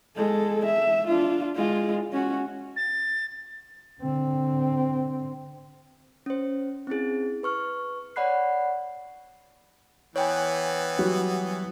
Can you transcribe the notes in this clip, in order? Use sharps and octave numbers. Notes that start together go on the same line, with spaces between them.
G#3 A4
E5
D4 F4
G#3 F4
C#4 F#4
A6
D3 C4
C#4 C5
C4 C#4 E4 G#4
B4 C#6 F6
C#5 D5 F#5 B5 F#6 C7
E3 B3 C#5 G5 G#5
F#3 G3 F#4